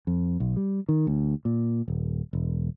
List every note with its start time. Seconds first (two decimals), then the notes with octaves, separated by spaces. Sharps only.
0.07 F2
0.40 B1
0.56 G3
0.89 D#3
1.07 D2
1.45 A#2
1.88 D#1
2.33 E1